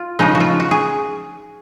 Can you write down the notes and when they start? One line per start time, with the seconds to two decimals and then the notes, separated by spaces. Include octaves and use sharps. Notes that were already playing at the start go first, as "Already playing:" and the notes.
Already playing: F4
0.19 C#3 F3 G#3 D#4
0.35 F#4
0.40 F4
0.60 F#4
0.71 G#4